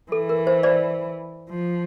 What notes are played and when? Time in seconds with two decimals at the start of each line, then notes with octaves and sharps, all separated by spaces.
0.12 E3 A4
0.29 A#4
0.47 C5
0.63 C5 D5
1.49 F3